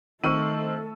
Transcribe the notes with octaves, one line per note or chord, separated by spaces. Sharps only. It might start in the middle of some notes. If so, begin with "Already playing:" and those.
D#3 A3 C4 A4 C#6 E6 D#7